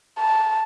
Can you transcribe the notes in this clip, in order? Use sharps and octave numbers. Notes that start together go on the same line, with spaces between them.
A5